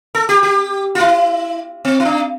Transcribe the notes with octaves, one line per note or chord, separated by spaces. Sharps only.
A4
G4
G4
F4
E4
C4
E4
D4